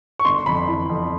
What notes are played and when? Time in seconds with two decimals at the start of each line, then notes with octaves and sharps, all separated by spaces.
0.19 C#6
0.25 G1 C6
0.46 F2 B5
0.68 E3
0.90 F2